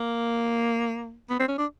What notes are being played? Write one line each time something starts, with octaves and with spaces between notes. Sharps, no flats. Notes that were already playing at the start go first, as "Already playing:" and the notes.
Already playing: A#3
B3
C4
C#4
D4